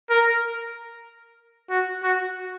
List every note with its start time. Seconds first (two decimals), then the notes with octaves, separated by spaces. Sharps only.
0.10 A#4
1.70 F#4
2.03 F#4